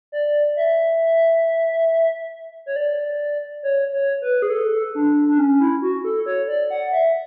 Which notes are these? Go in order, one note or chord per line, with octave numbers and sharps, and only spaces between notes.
D5
E5
C#5
D5
C#5
C#5
B4
G#4
A4
D4
D4
C#4
E4
F#4
A4
C#5
D5
F#5
E5